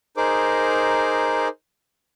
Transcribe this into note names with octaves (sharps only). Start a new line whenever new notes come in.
D#4 G#4 A#4 C5 D6